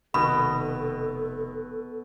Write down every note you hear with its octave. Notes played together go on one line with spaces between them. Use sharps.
F1 B2 D#3 A4 B5 D#6